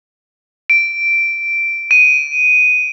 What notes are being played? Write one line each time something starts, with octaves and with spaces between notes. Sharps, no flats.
D7
D#7